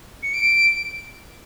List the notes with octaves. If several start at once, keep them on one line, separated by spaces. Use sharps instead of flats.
C#7
D7